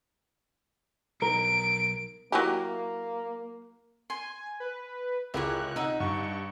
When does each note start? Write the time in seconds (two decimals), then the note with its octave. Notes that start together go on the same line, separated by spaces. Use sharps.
1.22 B1 A#4 D7
2.32 F#3 A#3 E4 G4
4.10 G#5 C6
4.60 B4
5.34 C#2 E4 G4 G#4 A#4 C#5 E5 F#6
5.76 C3 D#4 D#5 E5 F#5
6.00 G2 F#5 C#6